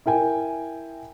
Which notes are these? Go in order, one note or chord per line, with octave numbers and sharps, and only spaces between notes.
E4 A#4 G5 G#5